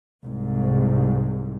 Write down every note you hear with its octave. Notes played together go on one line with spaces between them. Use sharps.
C2 G#2